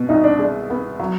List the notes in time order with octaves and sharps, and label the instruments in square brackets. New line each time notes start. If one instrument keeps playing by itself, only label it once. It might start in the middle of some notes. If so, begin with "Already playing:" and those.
Already playing: [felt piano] B2
[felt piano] C2 [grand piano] D#4
[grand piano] D4
[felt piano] G#3
B3
F#3